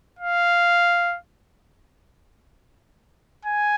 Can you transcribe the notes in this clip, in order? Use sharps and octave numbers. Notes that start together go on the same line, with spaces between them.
F5
G#5